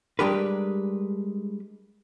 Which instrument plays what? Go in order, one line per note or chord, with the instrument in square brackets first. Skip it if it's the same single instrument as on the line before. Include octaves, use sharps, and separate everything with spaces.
[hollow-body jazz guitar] G3 G#3 D4 G4 A#4 B4